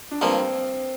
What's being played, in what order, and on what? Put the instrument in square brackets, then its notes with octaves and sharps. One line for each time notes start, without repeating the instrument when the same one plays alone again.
[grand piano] D4
[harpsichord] G2 F3 A#3 [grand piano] C4